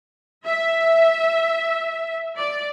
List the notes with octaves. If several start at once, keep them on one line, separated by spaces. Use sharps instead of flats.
E5
D5